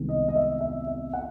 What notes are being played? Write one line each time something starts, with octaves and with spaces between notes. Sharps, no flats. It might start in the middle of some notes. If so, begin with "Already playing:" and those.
Already playing: C2 C3 D#3 G#3 B3
D#5
D#5
E5
E5
E5
F#5